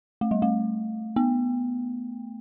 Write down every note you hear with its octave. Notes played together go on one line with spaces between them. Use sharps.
A3
G3
A3
B3